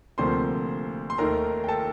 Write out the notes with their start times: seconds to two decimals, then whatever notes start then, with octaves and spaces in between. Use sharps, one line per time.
0.18 D2 C3 F3 A#3 C5 C6
1.10 C6
1.18 D#2 D#3 A3 A#4 A#5
1.64 G5
1.68 A4 A5